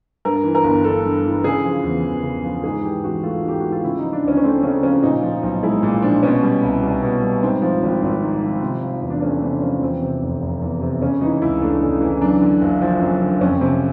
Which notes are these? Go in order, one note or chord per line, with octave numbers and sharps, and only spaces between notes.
G2 A#4
E3
A#4
G1
G1 A4
G2
E3
C#3 G#4
F3
E2
E2
C#3
F3
G#2 G#4
E3 G4
A1 F#4
A3 F4
G#2 G4
E3 F#4
F4
C#3 E4
F3 D#4
D4
D2 C#4
C#4
A3 C4
C#3 C#4
F3 C#4
A#2 D#4
F3
B1
G#3 E4
A#2
F3 D4
B2 C#4
G3
C2
C2
B2
G3
G#2 C4
F3
G#1
G#1
G#2
F3
C3
F3
E2
D4
A3 C#4
C3 D4
F3 C#4
E2 C4
C3
F1
F1
E2
C3
C#3 C#4
E3 D#4
C#2 E4
A3 D4
C#3
E3
F#2 D4
D3
F#1
F3
F#2
D3
F2 C#4
C3 C4